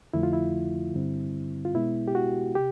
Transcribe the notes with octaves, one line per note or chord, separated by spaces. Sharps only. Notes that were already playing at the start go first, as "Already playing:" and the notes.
F2 D3 F3 A3 E4
F4
E4
G2 D3 G3 C4
F4
B2 G#3 B3 E4
G4
F#4
C3 G4